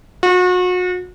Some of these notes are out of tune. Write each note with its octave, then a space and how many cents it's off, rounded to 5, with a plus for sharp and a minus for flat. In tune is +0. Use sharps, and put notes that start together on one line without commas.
F#4 -35